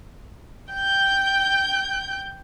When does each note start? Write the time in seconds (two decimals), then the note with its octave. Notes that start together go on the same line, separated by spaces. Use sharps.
0.72 G5 G6